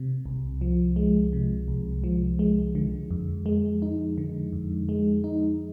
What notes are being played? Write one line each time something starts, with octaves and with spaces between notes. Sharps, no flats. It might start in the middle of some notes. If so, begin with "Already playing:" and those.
Already playing: C3
C2
F3
G#3
C3
C2
F3
G#3
D3
F2
G#3
D#4
D3
F2
G#3
D#4